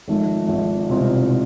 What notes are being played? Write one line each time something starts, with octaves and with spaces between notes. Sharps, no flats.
G#1 G#2 F3 A3
G#1 G#2 F3 A3
C2 B2 G#3 C4 F4